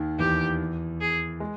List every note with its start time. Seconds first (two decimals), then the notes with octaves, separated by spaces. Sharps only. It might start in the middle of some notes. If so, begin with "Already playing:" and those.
Already playing: D#2 D#3
0.19 E2 E3 G4
1.00 G#4
1.40 G#3